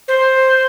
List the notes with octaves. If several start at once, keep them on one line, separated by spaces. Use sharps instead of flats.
C5